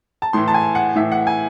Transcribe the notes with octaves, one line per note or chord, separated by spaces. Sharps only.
A5
A2 E3 C6
A5
G#5
F#5
A2 E3 E5
F#5
G#5